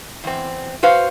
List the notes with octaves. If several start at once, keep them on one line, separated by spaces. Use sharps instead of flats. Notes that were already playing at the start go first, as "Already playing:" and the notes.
E2 C4
F#4 B4 C5 F5